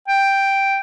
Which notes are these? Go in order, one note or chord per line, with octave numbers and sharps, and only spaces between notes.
G5